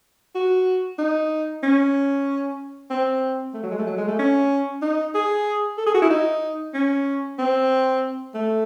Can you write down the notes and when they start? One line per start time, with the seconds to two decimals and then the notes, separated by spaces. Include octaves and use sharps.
0.35 F#4
0.99 D#4
1.63 C#4
2.90 C4
3.54 A3
3.63 F#3
3.71 G#3
3.78 A3
3.87 F#3
3.98 G#3
4.07 A3
4.19 C#4
4.82 D#4
5.14 G#4
5.78 A4
5.86 G#4
5.94 F#4
6.02 E4
6.10 D#4
6.74 C#4
7.39 C4
8.34 A3